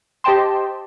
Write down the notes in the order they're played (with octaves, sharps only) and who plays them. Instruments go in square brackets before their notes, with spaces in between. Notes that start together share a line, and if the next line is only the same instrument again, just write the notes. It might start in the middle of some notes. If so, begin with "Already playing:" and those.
[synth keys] G4 C5 D#5 G5 A5 C6